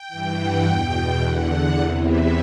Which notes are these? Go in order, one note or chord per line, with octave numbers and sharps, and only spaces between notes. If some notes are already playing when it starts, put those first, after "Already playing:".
Already playing: G5
G2 E3
F#5
E2 B2 G5
E2 D3 F#5
E2 C3 E3
E5